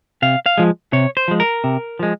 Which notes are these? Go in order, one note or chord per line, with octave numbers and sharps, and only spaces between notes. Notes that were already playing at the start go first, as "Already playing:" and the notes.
C3 F5
F5
F3 G#3
C3 C#5
C5
F3 G#3
A#4
C3
F3 G#3